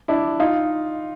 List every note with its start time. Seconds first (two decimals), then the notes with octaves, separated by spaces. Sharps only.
0.08 D4 E4
0.40 D#4 F4